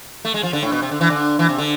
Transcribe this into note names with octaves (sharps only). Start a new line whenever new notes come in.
A3
G#3
F3
D3
A2
B2
C3
D3
E3
D3
E3
C3
D3